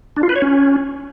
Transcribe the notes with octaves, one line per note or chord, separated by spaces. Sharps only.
D4
F4
B4
C#5
C#4